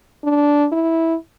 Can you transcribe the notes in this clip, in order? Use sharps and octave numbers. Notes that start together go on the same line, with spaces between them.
D4
E4